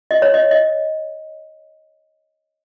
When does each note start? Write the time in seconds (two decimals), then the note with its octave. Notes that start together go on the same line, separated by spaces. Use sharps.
0.11 D#5
0.22 C#5
0.34 D#5
0.51 D#5